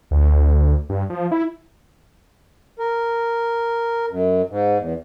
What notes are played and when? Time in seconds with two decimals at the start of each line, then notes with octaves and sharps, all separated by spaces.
0.11 D2
0.89 G2
1.10 F3
1.31 E4
2.79 A#4
4.09 F#2
4.49 G#2
4.78 E2